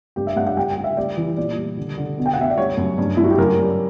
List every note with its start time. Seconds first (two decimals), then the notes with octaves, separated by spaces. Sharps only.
0.16 G2 G4
0.27 E5
0.36 G2 F#5
0.46 F#5
0.56 G3 G5
0.70 G5
0.77 G3
0.84 E5
0.97 G3 D5
1.17 E3
1.37 A#2 D5
1.57 G3
1.77 D3
1.98 D3
2.18 B2
2.26 G5
2.33 F#5
2.38 B2 E5
2.50 D5
2.58 G3 C#5
2.77 F#2
2.98 G2
3.17 G2 E4
3.24 F#4
3.31 G4
3.38 F#2 A#4
3.58 G3